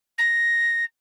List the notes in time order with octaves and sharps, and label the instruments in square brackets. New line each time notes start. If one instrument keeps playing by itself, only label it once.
[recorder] A#6